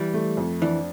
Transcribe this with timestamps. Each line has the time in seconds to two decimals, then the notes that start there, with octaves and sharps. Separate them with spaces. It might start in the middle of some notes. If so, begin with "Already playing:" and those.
Already playing: E3 G3
0.13 A3
0.37 F2
0.61 E3 D4